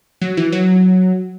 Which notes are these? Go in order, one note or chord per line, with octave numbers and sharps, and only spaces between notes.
F#3
E3
F#3